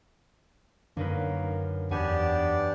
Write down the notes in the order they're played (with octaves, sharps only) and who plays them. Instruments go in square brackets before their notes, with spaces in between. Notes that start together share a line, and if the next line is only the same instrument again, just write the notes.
[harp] F#2 D#4 B4 [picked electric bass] D3 D4 [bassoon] A#3
[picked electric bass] E2 [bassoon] B3 [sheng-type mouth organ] D4 G4 [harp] G#5